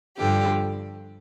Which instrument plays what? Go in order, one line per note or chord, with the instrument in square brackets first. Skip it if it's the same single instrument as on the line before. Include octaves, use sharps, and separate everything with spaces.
[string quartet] G2 D3 F3 G4